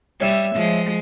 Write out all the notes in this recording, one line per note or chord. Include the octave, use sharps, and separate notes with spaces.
G3 C#5 E5
F3 G#3